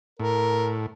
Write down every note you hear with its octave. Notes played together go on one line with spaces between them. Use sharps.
A2 A#4